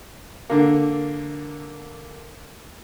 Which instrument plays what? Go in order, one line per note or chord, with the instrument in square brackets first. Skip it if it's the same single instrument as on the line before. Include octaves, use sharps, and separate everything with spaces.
[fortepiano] D3 A#3